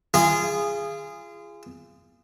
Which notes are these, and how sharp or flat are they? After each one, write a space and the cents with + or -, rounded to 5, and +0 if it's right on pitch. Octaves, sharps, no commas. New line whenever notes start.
F4 -35 G#4 -10